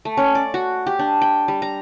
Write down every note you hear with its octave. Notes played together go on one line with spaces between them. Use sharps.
A3
C#4
D5
F#4
G4
D4
G5
G3
A#5